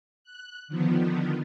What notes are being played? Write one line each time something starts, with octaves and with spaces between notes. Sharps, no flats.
F#6
D3 D#3 F3 B3